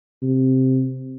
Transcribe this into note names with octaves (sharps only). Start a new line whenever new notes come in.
C3